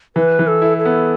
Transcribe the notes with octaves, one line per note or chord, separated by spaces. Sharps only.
E3 B4
E3
A4
E4
A4
B3